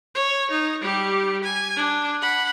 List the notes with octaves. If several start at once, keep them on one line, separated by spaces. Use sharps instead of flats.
C#5
D#4
G3 G4
G#5
D4
F#5 B5